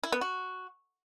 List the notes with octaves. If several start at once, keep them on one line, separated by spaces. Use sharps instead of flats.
E4
B3
F#4